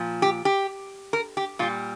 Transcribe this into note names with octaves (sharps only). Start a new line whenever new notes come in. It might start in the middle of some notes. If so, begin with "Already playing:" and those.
Already playing: A#2 F3
G4
G4
A#4
G4
A#2 G3 F4